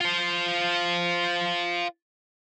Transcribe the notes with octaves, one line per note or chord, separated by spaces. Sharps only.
F4 C5